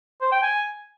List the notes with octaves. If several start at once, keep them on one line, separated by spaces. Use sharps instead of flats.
C5
G5
G#5